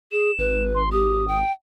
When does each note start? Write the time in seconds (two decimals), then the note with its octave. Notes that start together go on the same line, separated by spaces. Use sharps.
0.12 G#4 E7
0.39 G#1 B4
0.75 C6
0.92 G4 D#6
1.28 G5